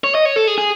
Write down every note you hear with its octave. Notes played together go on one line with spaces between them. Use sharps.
C#5
D#5
C#5
A4
G#4
G#4